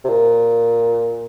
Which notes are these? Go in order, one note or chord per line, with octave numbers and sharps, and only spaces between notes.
C3
A#2